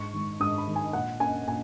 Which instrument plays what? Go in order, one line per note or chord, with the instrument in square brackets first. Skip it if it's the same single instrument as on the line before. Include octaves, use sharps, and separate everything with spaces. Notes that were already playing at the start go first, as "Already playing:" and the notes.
Already playing: [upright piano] G#2 C#6
D#3 G#3
G#2 D#6
B5
D#3 G#3
G#5
A#2 F#5
A#3 C#4 G#5
A#2 G#5